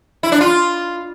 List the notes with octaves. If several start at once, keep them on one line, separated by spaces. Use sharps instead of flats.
E4
D4
F4